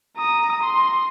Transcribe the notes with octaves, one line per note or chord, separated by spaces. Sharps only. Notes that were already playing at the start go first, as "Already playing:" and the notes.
A#5 D#6
C6